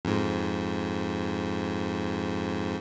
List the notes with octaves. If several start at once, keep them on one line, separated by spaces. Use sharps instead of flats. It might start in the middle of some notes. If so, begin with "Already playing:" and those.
F2 G#2